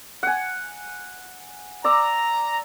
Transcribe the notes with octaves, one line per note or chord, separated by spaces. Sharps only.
F#5 G#5
D5 A#5 E6